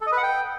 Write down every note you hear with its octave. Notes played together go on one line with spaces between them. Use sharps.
A4
D#5
B4
F#5
G5